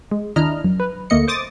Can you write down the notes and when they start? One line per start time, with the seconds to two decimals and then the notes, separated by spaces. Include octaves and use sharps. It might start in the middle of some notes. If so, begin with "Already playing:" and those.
0.11 G#3
0.36 D#2 D4 E4 D#5 A#5 F6
0.64 F#2
0.80 B4
1.10 D2 A3 A#3 D#5 C#7
1.28 C5 D6 D#6 A6